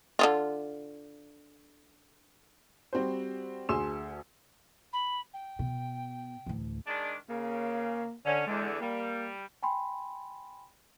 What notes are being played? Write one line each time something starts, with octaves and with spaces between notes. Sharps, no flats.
D3 E3 F4
G3 C4 F#4 C5
D2 G#4 G#5 C6 E6 E7
B5
G5
B2
A1 D2
D#3 G#3 D4
C#3 A#3
D3 C#4
E2 D3 G#3
G3 A#3
G5 G#5 B5 C6